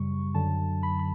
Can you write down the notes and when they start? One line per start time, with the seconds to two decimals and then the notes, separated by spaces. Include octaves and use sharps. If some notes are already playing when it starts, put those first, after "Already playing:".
Already playing: F#2 C#3 G3 C#6
0.34 F#2 D3 F#3 A5
0.83 B5
0.99 B5